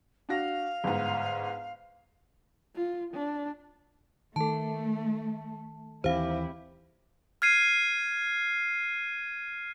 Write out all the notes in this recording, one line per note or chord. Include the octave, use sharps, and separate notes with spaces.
D4 F#4 F5 A#6
G1 G#2
F4
D4
D#3 A3 A4 A5
D#2 E3 C4 E4 G4 C5 F5
F6 G#6 C7 D#7